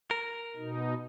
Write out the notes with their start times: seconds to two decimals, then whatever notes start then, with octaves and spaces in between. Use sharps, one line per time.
0.11 A#4
0.57 B2 D#4